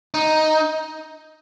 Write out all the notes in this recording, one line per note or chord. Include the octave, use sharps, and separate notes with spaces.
D#4